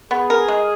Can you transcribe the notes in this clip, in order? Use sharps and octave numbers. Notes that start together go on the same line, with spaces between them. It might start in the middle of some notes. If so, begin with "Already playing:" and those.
B3 G#4
A#4
G#3